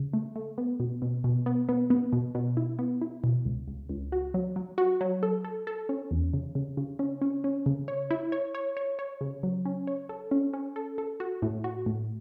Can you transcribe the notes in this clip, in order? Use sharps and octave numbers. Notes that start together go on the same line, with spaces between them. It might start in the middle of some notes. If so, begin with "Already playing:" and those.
Already playing: C#3
A3
A3
B3
B2
B2
B2
B3
B3
B3
B2
B2
E4
B3
E4
B2
C#2
C#2
C#2
F#4
F#3
F#3
F#4
F#3
A4
A4
A4
C#4
E2
C#3
C#3
C#3
C#4
C#4
C#4
C#3
C#5
E4
C#5
C#5
C#5
C#5
C#3
F#3
C#4
C#5
A4
C#4
C#4
A4
A4
F#4
A2
F#4
A2